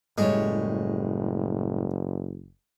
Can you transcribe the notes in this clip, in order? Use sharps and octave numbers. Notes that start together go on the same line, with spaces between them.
F#1 A2 G3 G#3 C#5